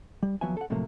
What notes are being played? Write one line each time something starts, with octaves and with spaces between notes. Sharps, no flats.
G3
D#2 F3 F#3 B3 E5 G#5
A4 F#5
A2 C3 F3 F#3 A3 A#3